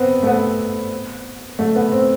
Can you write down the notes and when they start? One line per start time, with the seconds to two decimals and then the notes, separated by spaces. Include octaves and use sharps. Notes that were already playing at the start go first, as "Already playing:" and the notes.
Already playing: B3 C4
0.23 A3
0.27 B3
1.59 A3
1.76 B3
1.92 C4